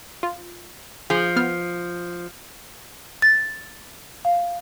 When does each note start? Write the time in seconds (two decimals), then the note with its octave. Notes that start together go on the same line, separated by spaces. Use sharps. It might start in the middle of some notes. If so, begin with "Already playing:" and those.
0.23 F4
1.10 F3 G#4
1.36 B3 F6
3.22 A6
4.25 F5